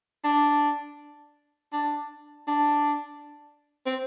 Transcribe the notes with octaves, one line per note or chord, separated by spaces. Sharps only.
D4
D4
D4
C4